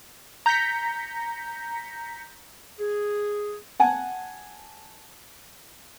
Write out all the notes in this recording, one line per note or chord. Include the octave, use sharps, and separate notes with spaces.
A#5 G6 A#6 B6 C#7
G#4
F#5 G#5 A5